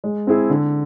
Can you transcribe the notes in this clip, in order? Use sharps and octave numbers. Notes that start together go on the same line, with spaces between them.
G#3
C4 E4 G#4
D3